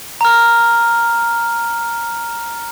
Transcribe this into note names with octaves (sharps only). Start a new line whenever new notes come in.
A#5 F6